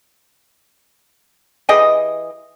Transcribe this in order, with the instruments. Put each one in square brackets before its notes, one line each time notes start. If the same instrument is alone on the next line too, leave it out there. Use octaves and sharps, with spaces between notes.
[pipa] E3 G4 G#4 D#5